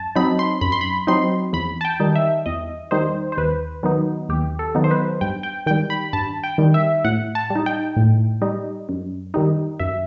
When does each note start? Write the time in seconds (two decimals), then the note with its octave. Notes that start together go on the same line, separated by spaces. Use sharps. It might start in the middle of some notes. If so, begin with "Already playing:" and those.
Already playing: F#2 A5
0.15 F#3 C4 D#4 B5
0.39 C6
0.61 F#2 B5
0.72 C6
0.81 B5
1.07 F#3 C4 D#4 C6
1.53 E2 B5
1.81 A5
1.85 G5
2.00 D#3 G3 D#4
2.15 E5
2.46 E2 D#5
2.91 D#3 G3 D#4 C5
3.32 C5
3.37 D#2 B4
3.83 D#3 F#3 B3 D#4
4.29 D#2 G4
4.59 A4
4.75 D#3 F#3 B3 D#4
4.84 C5
4.91 B4
5.21 G2 G5
5.43 G5
5.66 D#3 G5
5.71 G3
5.90 B5
6.13 G2 A5
6.44 G5
6.58 D#3 G3
6.74 E5
7.04 A2 F#5
7.35 A5
7.50 G3
7.56 D#4
7.66 G5
7.97 A2
8.42 G3 D#4
8.89 F#2
9.34 D#3 G3 D#4
9.79 F#2 E5